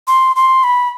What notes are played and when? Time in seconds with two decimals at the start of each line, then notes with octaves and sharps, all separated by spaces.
0.08 C6
0.36 C6
0.64 B5